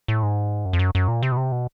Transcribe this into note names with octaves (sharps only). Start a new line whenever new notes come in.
A2
G#2
F#2
F2
F#2
F#2
A#2
C3
B2
C3
B2